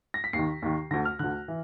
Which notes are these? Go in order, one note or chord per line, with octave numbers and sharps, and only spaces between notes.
A#6
B6
D#2 C7
D#3
D#2 D#3
D2 D3 A#6
F6
D2 D3 F#6
E3